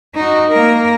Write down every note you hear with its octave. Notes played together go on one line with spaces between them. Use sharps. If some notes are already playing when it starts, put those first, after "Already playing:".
D#4 F#4
A#3 A#4